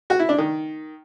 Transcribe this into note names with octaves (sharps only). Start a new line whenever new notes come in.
F#4
E4
D4
D#3